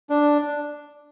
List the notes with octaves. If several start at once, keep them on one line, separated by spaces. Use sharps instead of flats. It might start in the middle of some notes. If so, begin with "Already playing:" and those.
D4